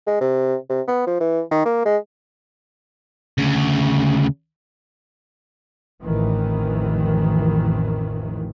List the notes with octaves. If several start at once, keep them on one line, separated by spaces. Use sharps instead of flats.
G#3
C3
C3
B3
F3
E3
D#3
A#3
G#3
D2 C#3
A1 F2 D#3 E3